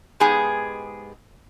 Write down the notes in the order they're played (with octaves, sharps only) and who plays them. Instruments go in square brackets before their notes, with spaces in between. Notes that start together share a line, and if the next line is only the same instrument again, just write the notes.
[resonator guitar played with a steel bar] G#2 G#3 B3 G4 G#4 G#5